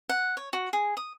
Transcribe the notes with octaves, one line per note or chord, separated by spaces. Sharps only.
F#5
C#5
F#4
G#4
D#6